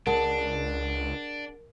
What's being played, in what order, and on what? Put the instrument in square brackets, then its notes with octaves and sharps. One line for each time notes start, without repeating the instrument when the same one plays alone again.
[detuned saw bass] C#2 [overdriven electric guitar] D4 [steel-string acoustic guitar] G#4 F#5 A5 [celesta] A#4